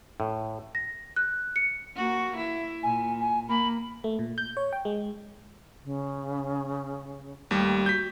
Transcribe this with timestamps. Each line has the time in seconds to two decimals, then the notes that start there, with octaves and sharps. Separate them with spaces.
0.20 A2
0.75 A#6
1.16 F#6
1.56 C#7
1.96 A#3 F#4
2.37 E4
2.83 A#2 G#5
3.20 G#5
3.49 A#3 B5
4.04 A3
4.19 A#2
4.38 G6
4.57 C#5
4.73 G5
4.85 G#3
5.84 C#3
7.51 D#2 G3 A3
7.86 F#4 G6 B6